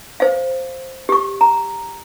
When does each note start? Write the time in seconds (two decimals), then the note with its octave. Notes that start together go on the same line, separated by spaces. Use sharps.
0.20 C5 F5
1.09 G4 C#6
1.41 A#5